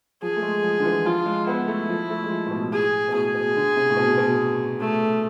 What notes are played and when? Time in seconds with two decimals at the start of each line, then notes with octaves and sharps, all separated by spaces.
0.22 F3 G#4
0.37 A3
0.43 G#3
0.64 F3
0.79 D3
0.85 E3
1.05 F3 F4
1.26 G#3
1.47 B3 E4
1.68 A3
1.89 F3
2.10 A3
2.24 G#3
2.30 F3
2.47 A2
2.51 B2
2.72 A2 G#4
3.08 B2
3.13 A2 G#4
3.35 B2
3.55 D3
3.76 C3
3.90 A2
3.97 B2
4.18 B2
4.80 A3